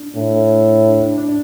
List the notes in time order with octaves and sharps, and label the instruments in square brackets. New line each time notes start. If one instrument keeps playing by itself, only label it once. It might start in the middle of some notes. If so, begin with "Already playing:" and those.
Already playing: [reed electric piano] D4
[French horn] A2
[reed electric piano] D4
D4
D4